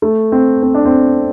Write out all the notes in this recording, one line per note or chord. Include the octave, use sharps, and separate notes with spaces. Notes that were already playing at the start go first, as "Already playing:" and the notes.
A3
C4
C4
D4
C4